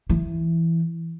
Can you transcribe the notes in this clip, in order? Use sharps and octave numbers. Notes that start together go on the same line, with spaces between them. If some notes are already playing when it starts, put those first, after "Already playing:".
E3